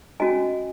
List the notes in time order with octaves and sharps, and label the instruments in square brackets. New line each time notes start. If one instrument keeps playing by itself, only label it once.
[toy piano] C#4 F#4 D#5 G#5